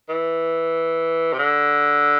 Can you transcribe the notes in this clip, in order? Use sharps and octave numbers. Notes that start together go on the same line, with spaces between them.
E3
C3
D3